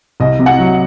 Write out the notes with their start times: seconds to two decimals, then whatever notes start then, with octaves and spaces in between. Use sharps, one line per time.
0.20 C2 D#5
0.39 C3
0.46 F#5
0.59 F#3